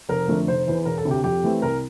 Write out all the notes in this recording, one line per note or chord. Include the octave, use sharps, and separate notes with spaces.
F1 A#4
F2 D3 A3
F1 C5
E2 E3
E1 A#4
A4
D2 C3
G4
F2 G4
E3 A3 C4
C2 A#4